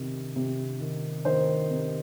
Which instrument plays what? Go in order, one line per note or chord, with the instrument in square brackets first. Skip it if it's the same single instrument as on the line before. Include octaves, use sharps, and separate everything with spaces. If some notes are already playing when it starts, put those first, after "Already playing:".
Already playing: [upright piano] C3 D#3
C3
D#3
D#3 C5
C3